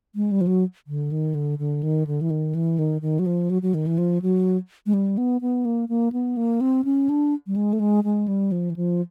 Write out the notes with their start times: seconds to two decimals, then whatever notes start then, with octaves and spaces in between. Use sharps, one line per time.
0.15 G#3
0.31 G3
0.41 F3
0.47 F#3
0.87 D3
1.11 D#3
1.35 D3
1.59 D3
1.83 D#3
2.07 D3
2.21 E3
2.30 D#3
2.55 E3
2.79 D#3
3.02 D#3
3.19 F#3
3.26 F3
3.50 F#3
3.62 F#3
3.74 D#3
3.86 E3
3.98 F3
4.22 F#3
4.86 G#3
4.94 G3
5.18 B3
5.41 B3
5.65 A#3
5.89 A#3
6.12 B3
6.37 A#3
6.61 C4
6.85 C#4
7.09 D4
7.47 G3
7.56 G#3
7.73 A3
7.80 G#3
8.04 G#3
8.28 G3
8.52 F3
8.70 E3
8.76 F3